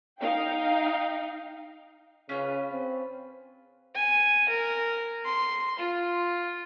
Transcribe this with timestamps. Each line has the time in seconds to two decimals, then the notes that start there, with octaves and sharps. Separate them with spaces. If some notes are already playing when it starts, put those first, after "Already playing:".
0.20 D#4 F5 G5
2.29 C#3 C#4 F4 B4
2.71 C4
3.95 G#5
4.49 A#4
5.25 C6
5.79 F4